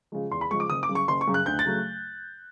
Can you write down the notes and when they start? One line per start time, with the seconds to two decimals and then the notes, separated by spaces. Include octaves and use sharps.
0.12 C#3 F3 G#3
0.31 E2 C6
0.41 B5
0.51 C#3 F3 G#3 C#6
0.60 D6
0.70 F#1 D#6
0.83 D6
0.89 F#2 C#3
0.95 C#6
1.08 F#1 C6
1.21 C#6
1.27 F#2 C#3
1.34 F#6
1.46 D2 G6
1.59 A6
1.65 C#3 F#3 A3